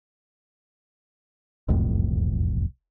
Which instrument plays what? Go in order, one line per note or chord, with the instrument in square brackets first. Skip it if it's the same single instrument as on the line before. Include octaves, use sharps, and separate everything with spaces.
[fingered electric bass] E1 C2 F2 A2